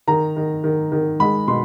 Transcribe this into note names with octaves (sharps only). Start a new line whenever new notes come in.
D#3 A#5
D#3
D#3
D#3
G#3 B5
B2 C6